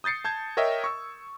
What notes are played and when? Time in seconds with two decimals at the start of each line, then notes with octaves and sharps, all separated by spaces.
0.04 D#6 G6 A6 C7 C#7
0.25 A5 G6 G#6
0.57 A#4 C#5 D#5 E5 G5
0.84 C#6 E6